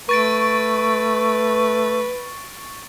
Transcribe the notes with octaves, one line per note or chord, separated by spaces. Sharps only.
A3 B4 C#6 A6 D7